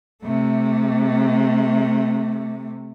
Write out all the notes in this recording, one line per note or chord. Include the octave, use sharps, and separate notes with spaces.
C3 A3